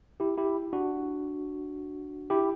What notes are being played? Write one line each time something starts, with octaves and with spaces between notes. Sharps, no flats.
E4 G4
E4 G4
D4 F#4
E4 G4